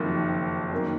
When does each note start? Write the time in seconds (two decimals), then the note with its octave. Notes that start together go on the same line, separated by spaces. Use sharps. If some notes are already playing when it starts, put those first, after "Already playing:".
Already playing: F#1 F2 D#3
0.71 F#2 D#3 A#3